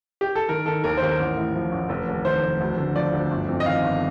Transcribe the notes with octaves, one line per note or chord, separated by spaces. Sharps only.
G4
A4
D#3 A#4
D#3 A4
D#2 A#4
D#2 C5
A#4
A1
A2
F3
A1
F1
D#2
D#3 C5
F1
D2
D3
F3 D5
D2
G1
F2
D#5
D#3 F5
G1